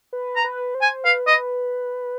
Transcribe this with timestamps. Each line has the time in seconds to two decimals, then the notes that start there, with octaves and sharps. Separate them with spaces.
0.13 B4
0.36 A#5
0.44 B4
0.75 C5
0.81 G#5
1.05 B4 F5
1.27 D#5